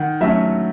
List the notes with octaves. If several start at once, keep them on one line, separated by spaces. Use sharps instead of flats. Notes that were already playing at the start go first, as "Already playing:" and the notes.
Already playing: D#3 F#5
F#3 A3 C#4 E5